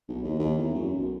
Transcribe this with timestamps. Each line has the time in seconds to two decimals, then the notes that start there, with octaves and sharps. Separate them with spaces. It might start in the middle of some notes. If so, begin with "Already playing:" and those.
0.08 B1
0.23 D#2
0.39 D#2
0.58 E2
0.74 F#2
0.94 B1